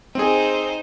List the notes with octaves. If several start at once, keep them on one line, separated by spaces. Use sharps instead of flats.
C4 D#4 G#4 C5